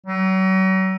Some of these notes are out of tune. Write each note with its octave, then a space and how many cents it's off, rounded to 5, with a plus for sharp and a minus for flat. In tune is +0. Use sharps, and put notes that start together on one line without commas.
F#3 +40